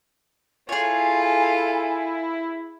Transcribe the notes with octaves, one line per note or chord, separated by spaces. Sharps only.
E4 F4 G#4 A4 C#5 G#5